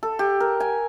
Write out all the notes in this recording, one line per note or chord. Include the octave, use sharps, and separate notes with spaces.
A4
G4
A#4
G#5